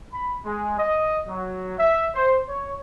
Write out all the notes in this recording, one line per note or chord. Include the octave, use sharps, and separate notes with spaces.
B5
G#3
D#5
F#3
E5
C5
C#5